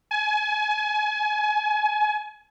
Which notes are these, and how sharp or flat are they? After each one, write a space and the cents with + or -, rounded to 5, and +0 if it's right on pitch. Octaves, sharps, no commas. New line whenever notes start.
G#5 +30